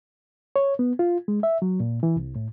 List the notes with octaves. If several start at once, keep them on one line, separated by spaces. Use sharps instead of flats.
C#5
B3
F4
G#3
E5
F#3
A#2
E3
C2
A2